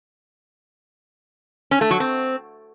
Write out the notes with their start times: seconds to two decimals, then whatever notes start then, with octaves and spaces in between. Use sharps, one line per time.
1.71 C#4
1.81 A3
1.91 F#3
2.00 C4